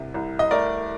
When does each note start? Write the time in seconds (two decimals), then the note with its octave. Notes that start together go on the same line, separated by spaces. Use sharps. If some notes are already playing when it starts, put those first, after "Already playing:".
Already playing: C2 C3
0.14 C2
0.39 D#5
0.51 A3 A#4 D5